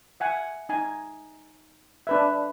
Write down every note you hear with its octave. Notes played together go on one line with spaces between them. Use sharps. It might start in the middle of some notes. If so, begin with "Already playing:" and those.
E5 F#5 G#5
D#4 G#5
D4 B4 E5